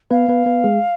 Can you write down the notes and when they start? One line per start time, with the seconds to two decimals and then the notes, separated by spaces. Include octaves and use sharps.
0.11 B3 B4 F5
0.28 B3 B4
0.46 B3 B4
0.64 G#3 G#4